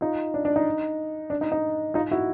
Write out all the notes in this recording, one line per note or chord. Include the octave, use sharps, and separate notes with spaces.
D#4 F4
D4
D4
D#4
D4
D#4
D#4
D#4 F4
E4 F#4